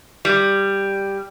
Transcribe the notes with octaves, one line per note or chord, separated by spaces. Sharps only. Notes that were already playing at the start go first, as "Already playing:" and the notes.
G3